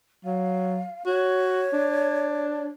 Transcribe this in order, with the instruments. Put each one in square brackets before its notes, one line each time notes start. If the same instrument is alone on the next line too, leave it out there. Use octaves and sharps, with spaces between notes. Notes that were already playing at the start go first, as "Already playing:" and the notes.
[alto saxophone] F#3 [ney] F5
[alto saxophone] F#4 [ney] C#5
[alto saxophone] D4